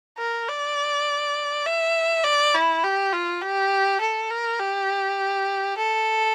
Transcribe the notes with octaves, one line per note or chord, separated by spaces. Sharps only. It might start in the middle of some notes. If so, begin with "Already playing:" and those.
A#4
D5
E5
D5
E4
G4
F4
G4
A4
A#4
G4
A4